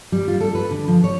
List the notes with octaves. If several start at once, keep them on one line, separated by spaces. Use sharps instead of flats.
G3
F4
A4
B4
D3
F3
C#5